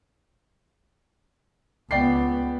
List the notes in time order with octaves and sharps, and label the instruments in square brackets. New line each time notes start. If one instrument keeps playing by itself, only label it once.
[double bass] C#2 B3 [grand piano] D5 G5 C7